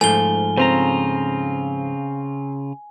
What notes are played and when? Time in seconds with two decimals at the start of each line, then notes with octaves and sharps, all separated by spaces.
0.01 G#2 F3 A3 G#5 G7
0.57 C#3 C4 F4 A#5